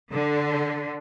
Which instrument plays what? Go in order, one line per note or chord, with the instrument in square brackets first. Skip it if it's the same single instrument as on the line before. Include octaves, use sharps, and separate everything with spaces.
[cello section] D3